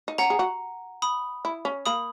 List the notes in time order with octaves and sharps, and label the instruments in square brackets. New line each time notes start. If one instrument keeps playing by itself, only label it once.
[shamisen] D#4
[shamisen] C#4 [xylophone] F#5 A#5
[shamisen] G#4
F#4
[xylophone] B5 D#6
[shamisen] E4
C#4
[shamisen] A#3 [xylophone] B5 D#6